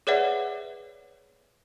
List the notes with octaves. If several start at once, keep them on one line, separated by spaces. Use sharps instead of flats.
G#4 B4 C#5 D5 E5 F#5